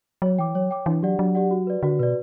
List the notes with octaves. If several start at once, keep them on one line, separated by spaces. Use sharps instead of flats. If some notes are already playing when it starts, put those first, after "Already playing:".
F#3 C#5
E3 G5 D6
F#3 C#5
G5 D6
E3 D4
F#3 G4 D5 F#5
F#3 D4
G4 D5 F#5
F#4
B4 D5
D3 F#4
B2 B4 D5